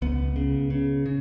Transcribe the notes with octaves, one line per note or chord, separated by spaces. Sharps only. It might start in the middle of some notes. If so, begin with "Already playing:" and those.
C#2 B3
C#3
C#3
C#3